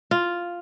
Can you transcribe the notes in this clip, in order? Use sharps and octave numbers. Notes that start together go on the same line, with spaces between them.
F4